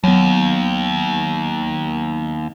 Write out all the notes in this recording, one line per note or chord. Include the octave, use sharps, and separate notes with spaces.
D#2 F#3 B3